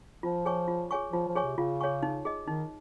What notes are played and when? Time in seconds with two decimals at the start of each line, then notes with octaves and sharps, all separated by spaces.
0.23 F3 F4
0.45 G#4 C#5 G#5 C#6
0.68 F4
0.91 G#4 C#5 G#5 C#6
1.13 F3 F4
1.28 F3
1.36 G#4 C#5 G#5 C#6
1.43 C3
1.58 C#3 F4
1.81 G#4 C#5 G#5 C#6
2.03 D#4
2.25 G#4 D#5
2.47 D#3 D#4